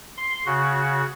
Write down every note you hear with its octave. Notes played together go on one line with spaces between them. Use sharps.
C6
C#3 F#4